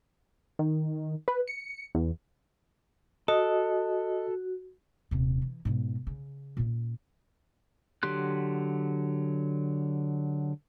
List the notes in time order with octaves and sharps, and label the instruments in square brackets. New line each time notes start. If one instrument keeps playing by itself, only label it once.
[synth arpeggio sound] D#3
B4
C#7
E2
[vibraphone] F#4 [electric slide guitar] A4 [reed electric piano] D#5
[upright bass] D#1 C3
E3
G#2 B2
C#3
A#2 C#4
[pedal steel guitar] D3 F#3 G4 C6 F#6